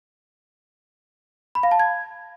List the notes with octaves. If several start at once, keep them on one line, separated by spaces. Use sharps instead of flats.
B5
F5
A5
G#6